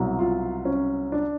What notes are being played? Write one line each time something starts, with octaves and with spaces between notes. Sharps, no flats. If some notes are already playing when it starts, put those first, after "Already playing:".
Already playing: C2 B2 F#3
F4
C#4
D4